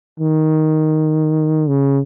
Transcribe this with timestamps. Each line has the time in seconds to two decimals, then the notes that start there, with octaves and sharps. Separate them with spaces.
0.20 D#3
1.69 C#3